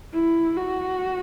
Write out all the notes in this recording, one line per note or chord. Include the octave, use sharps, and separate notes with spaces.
E4
F#4